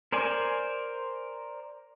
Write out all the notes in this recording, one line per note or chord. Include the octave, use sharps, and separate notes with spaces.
A#4 C5 D5 G#5